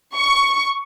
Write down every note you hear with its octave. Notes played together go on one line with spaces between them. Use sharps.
C#6